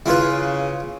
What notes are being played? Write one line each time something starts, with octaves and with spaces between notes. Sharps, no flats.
C#3 E4 F4 B4